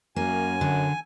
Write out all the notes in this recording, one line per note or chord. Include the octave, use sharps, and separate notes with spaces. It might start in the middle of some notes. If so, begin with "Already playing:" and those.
F#2 A#3 G#5
D3